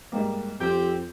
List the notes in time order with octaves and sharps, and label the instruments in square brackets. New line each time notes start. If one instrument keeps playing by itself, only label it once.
[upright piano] G#2 G3 A#3
[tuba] F2 [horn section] C4 [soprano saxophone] G4 [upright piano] G6